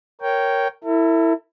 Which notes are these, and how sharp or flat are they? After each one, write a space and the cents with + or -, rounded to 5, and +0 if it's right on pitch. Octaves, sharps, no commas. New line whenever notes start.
A#4 +0 C#5 +0 G5 -10
E4 +0 A4 +45